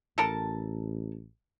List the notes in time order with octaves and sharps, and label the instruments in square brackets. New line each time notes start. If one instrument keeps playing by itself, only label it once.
[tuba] A1 [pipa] A4 A#4 A5